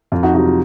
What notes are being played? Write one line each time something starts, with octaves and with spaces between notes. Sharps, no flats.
F2 F4
D#4 F#4
C3 F#3 D#4 F#4
F4